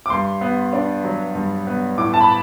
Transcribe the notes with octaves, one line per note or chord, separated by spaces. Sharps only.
D6
G2 C6
B3
D4
F#3
G2
B3
A2 D6
A5
B5